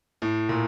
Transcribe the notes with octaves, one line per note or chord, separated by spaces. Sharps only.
A2
A#2